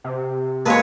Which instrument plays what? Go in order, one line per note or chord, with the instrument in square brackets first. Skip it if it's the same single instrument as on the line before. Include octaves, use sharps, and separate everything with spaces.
[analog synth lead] C3
[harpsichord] A#2 G#3 [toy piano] F#4 A#4 A5 [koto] B4 C#5